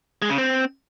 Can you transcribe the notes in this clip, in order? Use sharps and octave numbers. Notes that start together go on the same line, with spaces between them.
G#3
C#3
C4